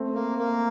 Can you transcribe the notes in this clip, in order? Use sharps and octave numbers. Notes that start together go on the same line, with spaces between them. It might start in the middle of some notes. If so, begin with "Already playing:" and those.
Already playing: A3 C4
A#3
A#3